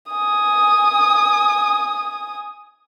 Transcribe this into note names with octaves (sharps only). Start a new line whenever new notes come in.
G#5 D#6